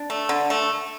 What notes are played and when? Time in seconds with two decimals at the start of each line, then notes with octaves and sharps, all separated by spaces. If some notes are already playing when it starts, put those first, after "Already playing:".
Already playing: D4
0.10 A3
0.29 D3
0.50 A3